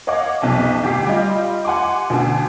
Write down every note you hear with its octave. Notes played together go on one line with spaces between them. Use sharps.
C#5 D#5 F5 F#5 D6
B1 F2 C3 A5
D2 G4 D6 B6 C7
G3 F4 D#5
F#5 G#5 C6 D6
D2 B2 D3